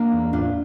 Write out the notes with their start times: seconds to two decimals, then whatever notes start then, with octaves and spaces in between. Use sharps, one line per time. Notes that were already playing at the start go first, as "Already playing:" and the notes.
Already playing: A#3 D4
0.12 E2
0.33 A2 D4 F4